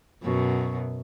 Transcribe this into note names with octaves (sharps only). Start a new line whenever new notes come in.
F#2 B2